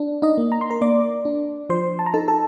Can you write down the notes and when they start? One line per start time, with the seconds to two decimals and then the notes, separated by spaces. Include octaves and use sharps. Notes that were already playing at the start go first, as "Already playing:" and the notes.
Already playing: D4
0.22 D#4 D#5
0.38 A#3
0.52 A#5
0.61 C6
0.70 A#4 A#5
0.81 A#3 D5 D6
1.25 D4
1.69 F3 C5 C6
1.99 A5
2.06 A#5
2.14 D#4 A4 A5
2.28 A4 A5